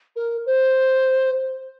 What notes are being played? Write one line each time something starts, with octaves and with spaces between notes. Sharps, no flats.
A#4
C5